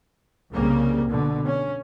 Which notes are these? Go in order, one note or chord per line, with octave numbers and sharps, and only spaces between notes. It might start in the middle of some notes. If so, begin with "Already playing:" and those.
C2 C#3 G3 A#3
B2 D3
C#4